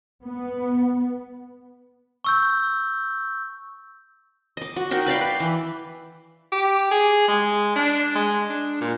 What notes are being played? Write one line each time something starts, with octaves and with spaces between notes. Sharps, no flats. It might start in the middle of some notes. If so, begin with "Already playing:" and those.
B3
C#6 E6 G6
D#5 D6
F#4
D#4 F#4 A#4 G5
B4 D5 F5 G5
B4
E3
G4
G#4
G#3
D4
G#3
D4
A#2